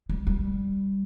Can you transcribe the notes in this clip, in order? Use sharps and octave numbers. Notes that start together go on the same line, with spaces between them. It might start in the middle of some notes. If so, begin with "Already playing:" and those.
G3
G3